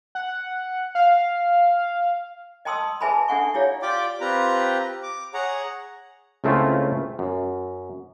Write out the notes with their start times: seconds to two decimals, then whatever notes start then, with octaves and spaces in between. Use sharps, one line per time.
0.15 F#5
0.95 F5
2.65 D#5 G5 A5 C6 D#6 E6
3.01 G#4 B4 E5 G#5 A5 B5
3.28 D4 A4 E5 F#5 G#5 C#6
3.54 E4 G4 C#5 D5 F5
3.82 F4 G4 D5 G5 D6
4.21 C4 F4 G4 B4 A#5
5.03 D6
5.34 G#4 C#5 F#5 A#5
6.44 C#2 C#3 A3 C4 E4 F4
7.19 F#2